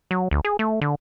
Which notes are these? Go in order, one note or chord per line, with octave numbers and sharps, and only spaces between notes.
F#3
D2
G#4
A3
D3